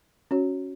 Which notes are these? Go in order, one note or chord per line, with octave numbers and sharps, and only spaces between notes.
C#4 F#4 C#5